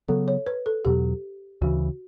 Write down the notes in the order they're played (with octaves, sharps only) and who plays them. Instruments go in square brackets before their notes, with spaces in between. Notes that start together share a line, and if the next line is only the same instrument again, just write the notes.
[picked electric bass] C#3 F#3 B3 [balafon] A4
[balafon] C#5
B4
A4
[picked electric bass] E2 B2 F#3 [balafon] G4
[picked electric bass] D2 C#3 E3 [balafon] F#4